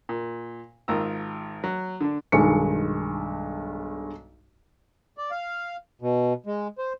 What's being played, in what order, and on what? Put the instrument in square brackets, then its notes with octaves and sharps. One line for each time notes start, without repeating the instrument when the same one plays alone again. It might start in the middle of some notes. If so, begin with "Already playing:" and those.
[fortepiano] A#2
G#1 D#3 F4 A#5 E6
F#3
D3 D4
[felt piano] B1 G2 D#3 G#3 C#7
[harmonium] D5
F5
B2
G#3
C5